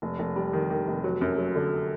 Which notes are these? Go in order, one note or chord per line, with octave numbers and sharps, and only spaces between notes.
F1
F1
G3
D#3
D#3
F1
F#3
F#2
F#3
D3